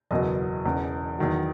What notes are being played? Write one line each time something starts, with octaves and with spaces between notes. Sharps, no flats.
F#1 E2 B2 F#3 D#5
E1 E2 C#3
E2 D#3 F#3